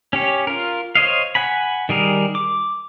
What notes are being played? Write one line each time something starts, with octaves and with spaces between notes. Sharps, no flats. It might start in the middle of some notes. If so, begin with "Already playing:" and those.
C#4 G4 C#5
F4 A#4
C5 C#5 D#5 F5
F#5 G#5 B5
D#3 G3 G#4 A#4
D6